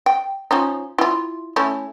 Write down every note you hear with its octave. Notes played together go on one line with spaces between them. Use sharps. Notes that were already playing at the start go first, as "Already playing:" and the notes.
G5
F3 C#4 D#4
E4 F4
A3 C#4 E4